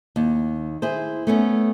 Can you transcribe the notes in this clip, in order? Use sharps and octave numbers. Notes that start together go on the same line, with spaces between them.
D#2
E4 G#4 C5
A3 B3 C#4